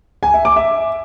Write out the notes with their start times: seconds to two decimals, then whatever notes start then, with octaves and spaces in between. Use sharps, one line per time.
0.23 G#5
0.34 E5
0.45 D6
0.56 E5